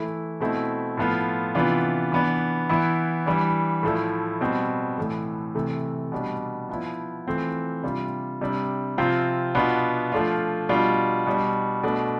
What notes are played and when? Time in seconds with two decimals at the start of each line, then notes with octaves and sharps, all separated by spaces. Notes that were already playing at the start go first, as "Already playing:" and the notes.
Already playing: E3 A3 E4
0.40 B2 A3 C4 E4
0.97 A2 F3 B3 F4
1.55 C3 E3 B3 D4 F4
2.12 E3 B3 D4
2.69 E3 B3 E4
3.26 E3 G3 D4
3.83 A2 F3 A3 E4
4.41 B2 G3 C4
4.98 A2 E3 A3
5.55 C3 E3 A3
6.12 B2 G3 D4
6.69 F3 B3 E4
7.26 E3 A3 C4 F4
7.83 C3 G3 D4 F4
8.41 C3 G3 D4
8.98 C3 F3 C4 F4
9.55 B2 B3 D4 F4
10.12 F3 A3 D4 F4
10.69 B2 G3 D4 F4
11.26 B2 G3 D4
11.83 B2 A3 D4